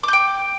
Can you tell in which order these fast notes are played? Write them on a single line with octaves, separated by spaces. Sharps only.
D6 G6 G5